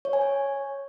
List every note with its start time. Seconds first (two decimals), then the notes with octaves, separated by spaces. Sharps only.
0.05 C#5
0.13 G#5
0.21 C#5